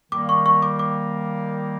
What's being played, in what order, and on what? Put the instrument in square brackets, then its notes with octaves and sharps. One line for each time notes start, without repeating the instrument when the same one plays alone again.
[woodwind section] D#3 G3 A#3 [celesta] D6
[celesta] C#6
C#6
D6
D6